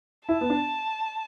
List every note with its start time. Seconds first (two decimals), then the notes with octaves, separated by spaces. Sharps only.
0.29 E4 A5
0.41 B3
0.50 D4